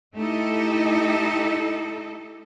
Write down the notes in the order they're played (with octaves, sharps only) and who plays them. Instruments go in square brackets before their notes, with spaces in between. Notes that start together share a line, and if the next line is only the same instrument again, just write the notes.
[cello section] A3 D#4 E4 G4 A4 D#5